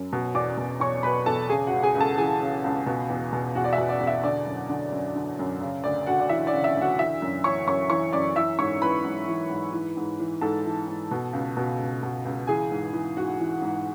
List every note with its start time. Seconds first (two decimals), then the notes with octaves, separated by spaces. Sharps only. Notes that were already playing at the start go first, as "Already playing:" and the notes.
Already playing: F#2
0.13 B2
0.35 E2 D5 D6
0.57 B2
0.80 E2 C#5 C#6
1.03 B2 B4 B5
1.26 E2 A4 A5
1.50 C#3 G#4 G#5
1.67 F#4 F#5
1.73 C#2
1.83 G#4 G#5
1.95 C#2
2.01 A4 A5
2.18 E3 G#4 G#5
2.40 C#3
2.64 C#2
2.86 B2
3.10 E2
3.33 B2
3.55 E2 F#4 F#5
3.64 D5
3.73 E5
3.78 B2
3.89 D5
4.01 E2
4.07 E5
4.24 D3 D5
4.46 F#2
4.69 D3
4.92 F#2
5.15 D3
5.39 F#2
5.61 C#3
5.84 D2 D5
6.07 D2 F#4 F#5
6.20 D5
6.29 E3 E5
6.47 D5
6.52 C#3
6.64 E5
6.76 D2
6.81 F#4 F#5
6.98 E3 E5
7.22 F#2
7.44 E3 C#5 C#6
7.67 F#2 C#5 C#6
7.90 E3 C#5 C#6
8.13 F#2 D5 D6
8.36 E3 E5 E6
8.59 G#2 C#5 C#6
8.81 E3 B4 B5
9.04 G#2
9.28 E3
9.50 G#2
9.73 E3
9.97 G#2
10.20 E3
10.41 G#2 A4 A5
10.65 E3
10.88 G#2
11.11 B2
11.33 C#2
11.57 B2
11.79 C#2
12.03 B2
12.25 C#2
12.47 E3 G#4 G#5
12.71 G#2
12.93 E3
13.17 G#2 F#4 F#5
13.40 E3
13.62 G#2